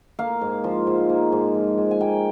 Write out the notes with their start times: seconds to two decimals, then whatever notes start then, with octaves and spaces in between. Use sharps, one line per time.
0.19 A#3 F5
0.41 G#2
0.64 F3
0.87 G#2
1.09 A#3
1.32 G#2
1.55 F3
1.78 G#2
1.91 G#5
2.01 A#3 G5